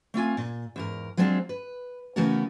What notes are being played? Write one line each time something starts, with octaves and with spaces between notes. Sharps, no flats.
A3 C4 F4 G#5
A#2
E2 G#2 A#4
F#3 G#3 C4 D4 F4
B4
C#3 E3 A3 B3 F#4 A#4